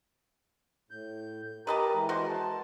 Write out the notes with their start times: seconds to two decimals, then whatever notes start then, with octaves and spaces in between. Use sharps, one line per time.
0.91 A2 G6
1.67 G4 A#4 B4 D#5 A5 A#5
1.94 E3 G#3
2.09 F#4 C5
2.28 A5